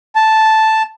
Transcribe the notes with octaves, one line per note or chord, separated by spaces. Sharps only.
A5